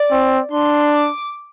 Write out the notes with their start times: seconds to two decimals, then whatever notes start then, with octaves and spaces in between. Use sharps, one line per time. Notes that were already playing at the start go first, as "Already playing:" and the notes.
Already playing: D5
0.11 C4
0.52 D4 C6
0.93 D6